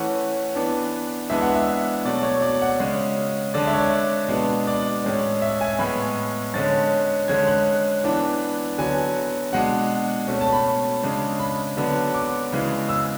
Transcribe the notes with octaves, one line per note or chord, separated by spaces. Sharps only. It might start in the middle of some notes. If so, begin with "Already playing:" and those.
Already playing: E3 A3 C#4 F#5
E3 B3 D4
E3 G#3 B3 D4 E5
F#5
E5
B2 F#3 A3 D5
C#5
D5
F#5
C#3 G#3 C#4
D3 G#3 D4 D5
E5
C#5
D5
B2 G#3 B3 D4
D5
A2 G#3 C#4
E5
G#5
A2 G#3 B3 B5
D3 G#3 C#4 A6
D3 G#3 C#4 G#6
F#6
E3 B3 D4
D3 F#3 B3 G#5
B2 G#3 D4 F#5
B2 A3 C#4
A5
B5
C#3 G#3 D4
B5
D3 F#3 B3 D4
D6
C#3 E3 G#3 C#4
E6